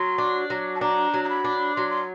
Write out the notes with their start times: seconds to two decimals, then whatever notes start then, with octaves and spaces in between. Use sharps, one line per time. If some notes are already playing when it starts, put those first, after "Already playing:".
Already playing: F#3 C6
0.18 D4
0.50 F#3
0.75 A5
0.81 D4 A#5
1.14 F#3
1.24 A#5
1.29 B5
1.44 D4
1.76 F#3 C6
1.90 C6